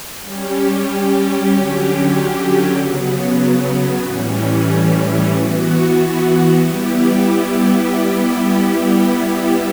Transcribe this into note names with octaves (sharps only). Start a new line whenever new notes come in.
G3 C#4 G4
D3 F#3 C#4 G4
C#3 F#3 B3
A2 E3 G3 C#4
E3 B3 F#4
G3 B3 E4 G4